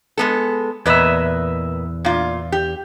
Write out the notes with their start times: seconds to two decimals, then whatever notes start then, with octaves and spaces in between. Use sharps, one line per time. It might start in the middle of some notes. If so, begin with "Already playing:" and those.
0.17 G#3 B3 A4
0.86 E2 A#2 B4 D#5 E5
2.05 A#2 F4
2.52 G4